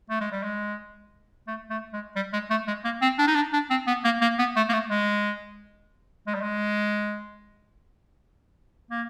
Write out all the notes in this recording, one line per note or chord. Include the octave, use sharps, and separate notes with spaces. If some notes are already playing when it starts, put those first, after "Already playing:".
A3
G#3
G3
G#3
A3
A3
G#3
G3
G#3
A3
G#3
A#3
C4
D4
D#4
D4
D4
C4
B3
A#3
A#3
B3
A3
A#3
A3
G#3
G#3
G3
G#3
A#3